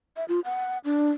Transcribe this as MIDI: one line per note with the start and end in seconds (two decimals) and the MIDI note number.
0.16 0.25 76
0.28 0.40 65
0.45 0.78 78
0.84 1.12 62